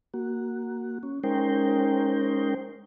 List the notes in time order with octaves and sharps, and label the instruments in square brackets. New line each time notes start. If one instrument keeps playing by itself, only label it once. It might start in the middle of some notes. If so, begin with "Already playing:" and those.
[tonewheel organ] A#3 F#4
C#4
G#3 C#4 D#4 A#4 C5 G5